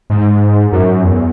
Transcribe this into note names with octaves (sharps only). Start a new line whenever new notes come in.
G#2
F#2
E2